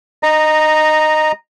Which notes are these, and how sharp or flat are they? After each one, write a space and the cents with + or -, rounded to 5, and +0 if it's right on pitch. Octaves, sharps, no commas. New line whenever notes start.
D#5 -15 A#5 +0